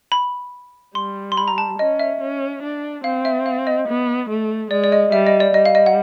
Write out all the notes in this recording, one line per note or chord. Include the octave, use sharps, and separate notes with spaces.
B5
G3 C6
C6
B5
A#5
A5
C#4 D#5
E5
C#4
D4
C4 F5
E5
F5
D#5
B3
A3
G#3 D5
D5
D#5
G3 E5
D#5
D5
G3 D#5
F5
D#5
F#5